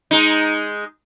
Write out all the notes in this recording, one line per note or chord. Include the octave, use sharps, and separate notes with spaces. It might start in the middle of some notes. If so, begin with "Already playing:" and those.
G#3 D#4